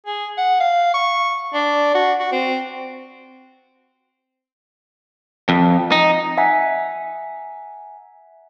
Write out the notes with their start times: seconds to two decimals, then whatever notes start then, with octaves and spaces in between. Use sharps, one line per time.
0.06 G#4
0.38 F#5
0.60 F5
0.94 C#6
1.54 D4
1.94 F#4
2.20 F#4
2.32 C4
5.49 F2
5.92 D#4
6.37 E5 F#5 G#5 A#5 B6